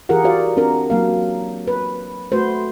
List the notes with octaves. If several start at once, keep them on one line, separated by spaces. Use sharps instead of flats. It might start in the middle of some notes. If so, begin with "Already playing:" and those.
E3 F4 G4 G#4 A#4 F#5
F#4 G4 C5 D5 F5
C4 D4 A#4
F#3 A#3 F5
B4
A3 F#4 B4 C5